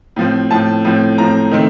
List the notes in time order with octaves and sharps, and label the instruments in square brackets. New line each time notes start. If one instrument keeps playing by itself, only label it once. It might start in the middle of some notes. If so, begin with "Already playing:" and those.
[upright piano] A2 F3 C4
A2 F3 C4 A5
A2 F3 C4
A2 F3 C4 A#5
D#3 A3 C4